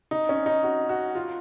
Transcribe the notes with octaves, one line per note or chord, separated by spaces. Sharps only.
D#4
C#4
D#4
F#4
F#4
F4